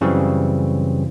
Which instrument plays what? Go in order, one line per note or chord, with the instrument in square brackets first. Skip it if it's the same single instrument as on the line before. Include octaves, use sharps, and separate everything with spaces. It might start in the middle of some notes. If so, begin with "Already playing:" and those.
[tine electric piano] F#2 C#3 E3 F#3 G3 C4